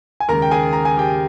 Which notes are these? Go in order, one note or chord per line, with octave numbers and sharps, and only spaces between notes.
G#5
D#2 C#3 G#3 A#4 A#5
G5
G#4 G#5
A#5
G#5
G4 G5